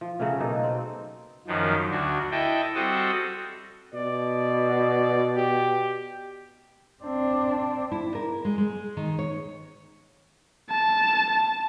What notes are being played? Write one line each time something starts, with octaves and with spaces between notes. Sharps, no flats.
F3
C#3 F#3 A3 C#4
B2 A#3 D#4 A4
C4
F#2 D#3 F3
D2 D4 F#4
E4 A4 D#5 G5
G3 C4 F#4 A4 D#5 F#5
B2 D5
G4
C4 D4
E4
A#4
G#3
G#3
D#3
C#5
A5